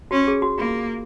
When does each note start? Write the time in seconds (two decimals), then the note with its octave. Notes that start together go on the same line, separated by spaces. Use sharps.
0.11 C#4 F#4
0.27 G#4
0.42 F#4
0.58 A#3 F4